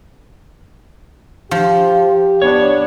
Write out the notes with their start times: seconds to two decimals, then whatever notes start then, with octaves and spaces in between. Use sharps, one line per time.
1.51 F3 G4
2.42 B3 D4 C#5